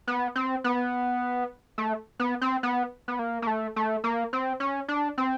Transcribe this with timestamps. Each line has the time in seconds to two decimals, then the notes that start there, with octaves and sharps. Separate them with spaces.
0.07 B3
0.35 C4
0.64 B3
1.78 A3
2.20 B3
2.41 C4
2.63 B3
3.08 B3
3.19 A#3
3.42 A#3
3.47 A3
3.76 A3
4.04 A#3
4.33 C4
4.60 C#4
4.88 D4
5.18 C4